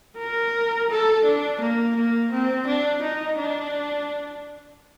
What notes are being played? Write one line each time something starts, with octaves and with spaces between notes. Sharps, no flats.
A#4
A4
D4
A#3
A#3
C4
D4
D#4
D4